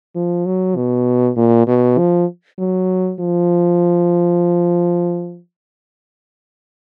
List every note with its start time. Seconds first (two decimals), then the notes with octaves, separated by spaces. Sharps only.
0.16 F3
0.46 F#3
0.76 B2
1.36 A#2
1.68 B2
1.98 F3
2.59 F#3
3.20 F3